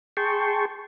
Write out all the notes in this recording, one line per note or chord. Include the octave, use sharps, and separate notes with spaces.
G#4 G5 A5 C6 C#6